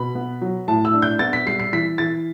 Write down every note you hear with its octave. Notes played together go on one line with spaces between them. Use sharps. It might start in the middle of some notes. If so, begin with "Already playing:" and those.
Already playing: B2 B5
B3
F#3
A2 A5
E6
D4
G6
B3 A6
B6
G3 C7
C7
E3 B6
E3 A6